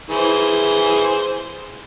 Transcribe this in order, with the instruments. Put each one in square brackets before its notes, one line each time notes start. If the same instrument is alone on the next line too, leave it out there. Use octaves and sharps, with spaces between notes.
[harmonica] E3 G#4 C5